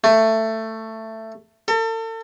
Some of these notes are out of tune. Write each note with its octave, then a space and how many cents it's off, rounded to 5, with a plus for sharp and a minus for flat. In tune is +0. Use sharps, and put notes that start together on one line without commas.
A3 +15
A4 +40